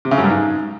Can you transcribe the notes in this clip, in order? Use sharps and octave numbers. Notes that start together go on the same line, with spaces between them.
C3
C#3
F#2
G2
G#2